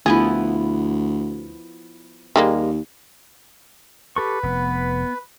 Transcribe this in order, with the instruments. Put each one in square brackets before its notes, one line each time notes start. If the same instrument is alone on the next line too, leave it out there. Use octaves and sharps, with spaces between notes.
[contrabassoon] D2 [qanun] F3 B3 E4 [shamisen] G#4
[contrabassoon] D#2 [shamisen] G3 G#3 A#3
[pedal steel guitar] G4 A4 C#6 [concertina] B4
[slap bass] F1 [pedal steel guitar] B3